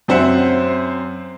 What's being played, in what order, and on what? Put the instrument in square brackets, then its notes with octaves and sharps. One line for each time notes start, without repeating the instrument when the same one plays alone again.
[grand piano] F#2 C4 C5 E5 F#5